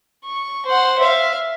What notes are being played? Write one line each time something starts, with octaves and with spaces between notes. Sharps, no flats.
C#6
C5 F#5
E5 F5